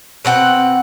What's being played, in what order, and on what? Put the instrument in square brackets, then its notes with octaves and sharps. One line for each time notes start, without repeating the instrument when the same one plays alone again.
[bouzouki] B2 C4 F#5 G5